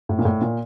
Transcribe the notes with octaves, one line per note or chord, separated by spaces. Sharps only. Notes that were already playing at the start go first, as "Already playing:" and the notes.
A2
A#2
A2
A#2